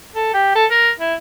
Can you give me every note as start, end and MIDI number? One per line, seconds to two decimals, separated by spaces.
0.16 0.31 69
0.34 0.55 67
0.56 0.65 69
0.71 0.90 70
1.00 1.14 64